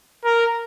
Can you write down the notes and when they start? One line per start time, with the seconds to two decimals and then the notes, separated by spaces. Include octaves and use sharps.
0.25 A#4